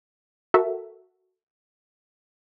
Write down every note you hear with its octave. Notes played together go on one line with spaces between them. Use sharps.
F#4 A4 A#4 E5